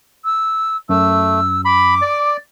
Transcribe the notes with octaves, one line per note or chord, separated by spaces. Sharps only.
E6
F#2 A3 E6
B5 D6
D5